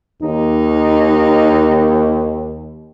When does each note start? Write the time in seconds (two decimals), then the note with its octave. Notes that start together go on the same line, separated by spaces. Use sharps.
0.22 D#2 D#4